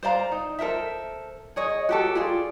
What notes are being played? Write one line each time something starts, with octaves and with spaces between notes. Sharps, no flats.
C5 D5 F5 A#5
D#4
A4 A#4 C5 E5
G#4 C#5 D#5
F#4 G4 A4
F4 G#4 D5